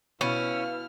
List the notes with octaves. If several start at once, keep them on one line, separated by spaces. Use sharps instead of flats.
B2 C#4 E4 B4 F5 F6